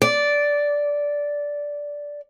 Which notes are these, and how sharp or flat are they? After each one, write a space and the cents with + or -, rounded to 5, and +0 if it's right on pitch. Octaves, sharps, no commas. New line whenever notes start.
D5 -10